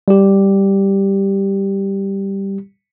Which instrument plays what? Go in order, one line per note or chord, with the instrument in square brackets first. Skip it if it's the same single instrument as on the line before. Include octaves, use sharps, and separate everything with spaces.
[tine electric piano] G3 G4